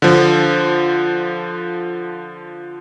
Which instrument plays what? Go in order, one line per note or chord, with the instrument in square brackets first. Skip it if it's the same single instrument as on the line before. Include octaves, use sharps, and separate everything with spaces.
[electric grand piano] D3 F3